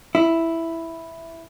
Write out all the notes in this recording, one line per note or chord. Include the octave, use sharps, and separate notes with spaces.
E4